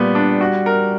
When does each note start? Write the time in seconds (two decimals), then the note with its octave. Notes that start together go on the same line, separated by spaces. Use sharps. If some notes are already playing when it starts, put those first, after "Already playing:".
Already playing: A#2 G3 B3
0.15 D4
0.41 F#4
0.66 A#4